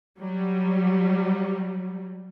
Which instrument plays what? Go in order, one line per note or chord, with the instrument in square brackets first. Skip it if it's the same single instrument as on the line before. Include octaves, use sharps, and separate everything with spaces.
[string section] F#3 G3